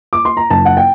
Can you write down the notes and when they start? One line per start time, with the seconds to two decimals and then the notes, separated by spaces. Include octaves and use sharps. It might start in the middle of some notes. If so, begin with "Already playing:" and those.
0.13 D6
0.25 C6
0.37 A#5
0.50 F#1 A5
0.65 F#5
0.77 G5